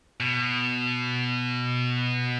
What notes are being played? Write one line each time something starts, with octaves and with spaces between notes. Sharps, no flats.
B2